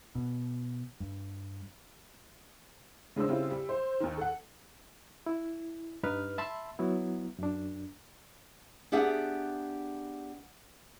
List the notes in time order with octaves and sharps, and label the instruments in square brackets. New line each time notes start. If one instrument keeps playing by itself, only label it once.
[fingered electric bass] B2
G2
[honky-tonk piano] C#3 G#3 D4 C5 E6
C#3 G3 C4 E4 F4
G3
C5
D#2 D#3
A4 F#5
[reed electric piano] E4
G2 D#4 B4 F6
E5 A5 B5 C6 E6
F#3 B3 E4
F#2 D4
[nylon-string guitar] B3 D4 G4 G#4 E5 F#5